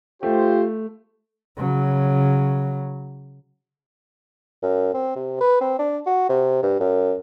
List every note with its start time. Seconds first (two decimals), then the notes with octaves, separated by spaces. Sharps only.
0.23 A3 F4 G4 C5
1.56 C#3 F#3
4.63 F#2
4.94 C4
5.16 C3
5.41 B4
5.61 C4
5.79 D4
6.06 F#4
6.29 C3
6.63 G2
6.80 F#2